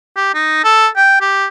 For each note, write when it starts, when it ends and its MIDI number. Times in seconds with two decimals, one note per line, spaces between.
0.16 0.30 67
0.34 0.62 63
0.64 0.87 69
0.96 1.21 79
1.21 1.47 67